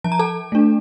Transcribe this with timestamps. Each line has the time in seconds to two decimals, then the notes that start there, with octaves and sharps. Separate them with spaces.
0.04 F3 A5
0.12 A#5
0.19 A4 A5
0.52 A3 D4